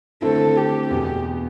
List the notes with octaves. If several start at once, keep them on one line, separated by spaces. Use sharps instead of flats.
D3 A3 C4 E4 A4
G4
E2 B2 B3